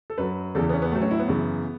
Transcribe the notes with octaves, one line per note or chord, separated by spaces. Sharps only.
A4
F#2 F#3 B4
E2 C#3 E3 A4
B3
C#4
B3
A2 F#3 A3
C#4
E4
B3
F#2 C#3 E3